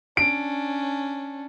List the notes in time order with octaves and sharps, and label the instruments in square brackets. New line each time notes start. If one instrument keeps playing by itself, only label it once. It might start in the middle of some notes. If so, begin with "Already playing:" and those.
[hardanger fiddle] C#4 D4 [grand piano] D7